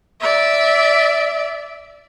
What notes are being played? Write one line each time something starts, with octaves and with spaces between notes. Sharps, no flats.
D5 E5